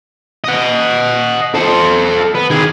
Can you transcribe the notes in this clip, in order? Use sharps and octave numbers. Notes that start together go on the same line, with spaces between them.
D#5 F#5
A4 C5
B3
D#3 G#4